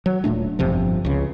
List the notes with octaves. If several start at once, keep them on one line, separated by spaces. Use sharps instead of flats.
F#3
D#1 A#2 A3 D4
G1 F2 C3 F3
C#2 C#3